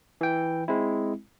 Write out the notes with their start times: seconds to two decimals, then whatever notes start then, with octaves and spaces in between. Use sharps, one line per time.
0.21 E3 G5
0.68 G#3 C4 E4